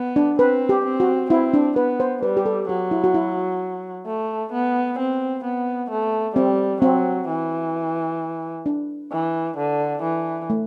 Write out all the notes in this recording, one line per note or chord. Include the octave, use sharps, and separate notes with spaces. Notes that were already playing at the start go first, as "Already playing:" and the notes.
Already playing: B3
D4
C4 B4
G4
C4
F#4
C4 E4
D4
B3 B4
C5
G3 B4
G4
A4
F#3 G4
E4
F#4
E4
A3
B3
C4
B3
A3
G3 C4
F#3 C4
E3
D4
E3
D3
E3
A3